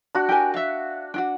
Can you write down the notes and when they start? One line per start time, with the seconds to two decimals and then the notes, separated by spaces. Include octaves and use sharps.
0.15 D4 F#4
0.29 G4 A#4 G#5
0.54 E5 F5
1.14 D4 F4 F#4